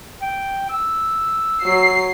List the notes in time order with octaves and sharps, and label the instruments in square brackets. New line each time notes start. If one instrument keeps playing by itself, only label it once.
[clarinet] G5
E6
[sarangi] F#3 [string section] C7